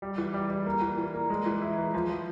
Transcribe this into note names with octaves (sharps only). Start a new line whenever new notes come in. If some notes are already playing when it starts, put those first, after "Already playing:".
G3
E3
G3
G3
A#3
E3
E3
A#3
G#3
E3
E4
E3
F3
F3